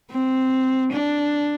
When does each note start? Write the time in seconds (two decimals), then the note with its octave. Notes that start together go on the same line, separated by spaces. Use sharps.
0.11 C4
0.92 D4